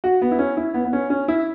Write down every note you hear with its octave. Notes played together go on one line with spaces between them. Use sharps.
F#4
B3
E4
C#4
E4
B3
B3
C#4
C#4
E4